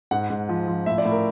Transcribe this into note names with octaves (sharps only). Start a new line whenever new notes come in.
G#2 F#5
G#2
F3
F3
A2 E5
D5
A2
A#4